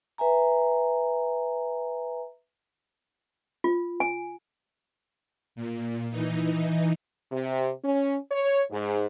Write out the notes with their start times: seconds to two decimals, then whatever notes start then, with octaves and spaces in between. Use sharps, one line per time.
0.18 B4 E5 G#5 A#5
3.64 F4
4.00 G#5
5.55 A#2
6.11 E3 D#4
7.32 C3
7.84 C#4
8.31 C#5
8.71 G#2